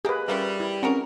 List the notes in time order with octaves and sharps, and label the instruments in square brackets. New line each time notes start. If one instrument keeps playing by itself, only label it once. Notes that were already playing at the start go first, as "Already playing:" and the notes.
[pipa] G#3 A#3 [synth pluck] G4 [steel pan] G#4 B4
[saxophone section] G3 [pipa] C#4 F4 E5 [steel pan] A#4 B4
[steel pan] E4
[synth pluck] C4 C#4 [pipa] F#4 G#4 A#4